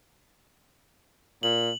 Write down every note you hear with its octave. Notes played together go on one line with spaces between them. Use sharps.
A#2 F#7